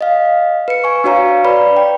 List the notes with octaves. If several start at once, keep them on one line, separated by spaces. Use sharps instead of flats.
D#5 F5
B4 C#7
G#5 C#6
D4 F#4 C#5 F5 A#5
B4 D5 A#5 B5
G5